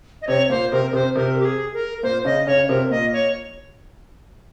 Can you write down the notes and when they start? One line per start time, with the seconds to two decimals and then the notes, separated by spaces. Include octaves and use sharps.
0.22 D#5
0.27 C3 C4 C#5
0.50 A#2 A#3 C5
0.72 C3 C4 A#4
0.93 C3 C4 C5
1.15 C3 C4 A#4
1.39 G4
1.45 G#4
1.74 A#4
2.03 A#2 A#3 C5
2.25 C#3 C#4 D#5
2.47 C#3 C#4 C#5
2.68 C3 C4 A#4
2.90 A#2 A#3 D#5
3.13 C#5